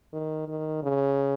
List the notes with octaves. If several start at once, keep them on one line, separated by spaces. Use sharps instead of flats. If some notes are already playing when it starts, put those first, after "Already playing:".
D#3
D#3
C#3